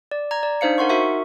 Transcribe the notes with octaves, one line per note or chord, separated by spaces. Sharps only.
D5
A#5 G#6
D5
D4 D#4 C5 F5 C#7
D#4 A#4 F#5 C6 C#6
F#4 A#4 E5 C#6